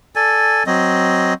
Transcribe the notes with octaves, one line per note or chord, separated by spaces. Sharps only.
A4 D5 G#5
F#3 C4 D#5